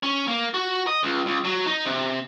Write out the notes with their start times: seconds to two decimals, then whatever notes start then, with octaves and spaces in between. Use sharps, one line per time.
0.03 C#4
0.28 A#3
0.54 F#4
0.87 D#5
1.03 C#2
1.26 C#2
1.45 F#3
1.66 D#4
1.86 C3